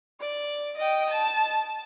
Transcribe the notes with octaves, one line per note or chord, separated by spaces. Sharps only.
D5
D#5 G5
A5